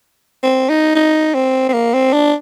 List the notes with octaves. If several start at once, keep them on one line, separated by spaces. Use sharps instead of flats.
C4
D#4
D#4
C4
C4
A#3
C4
D4